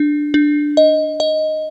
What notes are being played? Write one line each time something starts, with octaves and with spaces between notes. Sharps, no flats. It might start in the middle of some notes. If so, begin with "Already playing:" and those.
Already playing: D4
D4
D#5
D#5